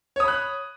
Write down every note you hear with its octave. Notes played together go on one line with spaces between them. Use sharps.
C#5 B5 D#6 F#6